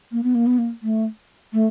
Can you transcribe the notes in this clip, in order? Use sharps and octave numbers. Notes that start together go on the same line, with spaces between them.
A#3
B3
A#3
B3
A#3
A3
A3